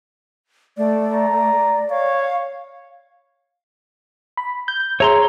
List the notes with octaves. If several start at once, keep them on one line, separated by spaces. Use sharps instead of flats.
A3 D5
A#5
C#5 F5
B5
G6
G#4 C#5 E5 A#5 C6